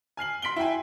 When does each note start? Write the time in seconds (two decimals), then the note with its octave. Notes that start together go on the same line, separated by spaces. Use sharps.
0.17 G#5 F6 C7 F#7
0.42 C6 B6 D7 F#7 G7
0.56 E4 F#4 G5 G#5